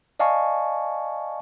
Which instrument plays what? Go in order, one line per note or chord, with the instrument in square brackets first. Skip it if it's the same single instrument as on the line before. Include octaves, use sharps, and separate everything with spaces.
[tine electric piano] D5 D#5 F5 G#5 A5 C#6